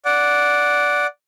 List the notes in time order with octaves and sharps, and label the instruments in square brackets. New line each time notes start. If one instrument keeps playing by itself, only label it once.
[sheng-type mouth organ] D5 F#5